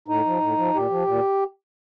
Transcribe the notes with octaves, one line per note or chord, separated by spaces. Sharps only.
A2 D#4
F3
A2
F3
A#2 G4
F3
A#2